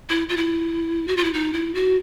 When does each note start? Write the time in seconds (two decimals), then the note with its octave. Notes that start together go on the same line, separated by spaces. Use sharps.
0.09 E4
0.29 F4
0.37 E4
1.08 F#4
1.17 F4
1.24 E4
1.33 D#4
1.53 E4
1.75 F#4